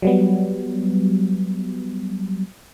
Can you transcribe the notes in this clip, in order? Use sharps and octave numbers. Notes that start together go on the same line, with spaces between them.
F#3 G3 B3